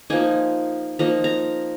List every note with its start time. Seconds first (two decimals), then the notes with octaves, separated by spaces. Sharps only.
0.10 F3 A#3 D#4 G#5
0.99 F3 A#3 D#4 A#5
1.24 A#5